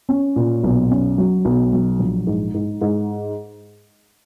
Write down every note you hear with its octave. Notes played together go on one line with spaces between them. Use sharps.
C#4
A#2
B1
C#4
F#3
B1
F#3
A#1
G#2
G#2
G#2